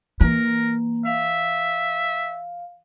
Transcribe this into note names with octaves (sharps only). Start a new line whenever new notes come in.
E3 A#3 A#4
E5 F5